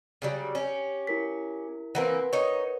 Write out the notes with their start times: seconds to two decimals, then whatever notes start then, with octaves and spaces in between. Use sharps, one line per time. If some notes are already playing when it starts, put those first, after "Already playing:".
0.22 C#3 F#3 G3
0.55 C#4 G4
1.07 E4 A#4 B6
1.95 E3 A#3 C4 A#4 B4 F#5
2.33 D#4 C#5